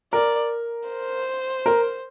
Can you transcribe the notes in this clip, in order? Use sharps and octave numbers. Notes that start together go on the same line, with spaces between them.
A#4 D5
C5
A#4